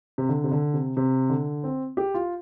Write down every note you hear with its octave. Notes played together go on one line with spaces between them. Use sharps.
C3
D3
C3
D3
C3
C3
D3
C4
G4
F4